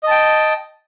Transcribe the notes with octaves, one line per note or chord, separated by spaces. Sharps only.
D#5 G5 A5